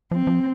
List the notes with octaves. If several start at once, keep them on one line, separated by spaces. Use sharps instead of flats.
F3 C4
F3